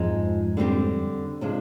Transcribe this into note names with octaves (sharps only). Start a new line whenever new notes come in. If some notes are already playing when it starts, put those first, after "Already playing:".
Already playing: F2 G#2 F3 G#3 C4 D#4
D3 G3 C4 G4
C3 F3 G#3 D4